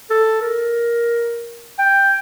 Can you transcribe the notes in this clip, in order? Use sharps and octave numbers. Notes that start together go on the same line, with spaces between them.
A4
A#4
G5